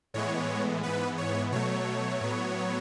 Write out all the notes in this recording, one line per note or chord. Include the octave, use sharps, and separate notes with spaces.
A2 E3 G#3 B3 C#5
G#2 E3 B3 B4
C#5
B2 F#3 A3 C#5
A2 F#3 B3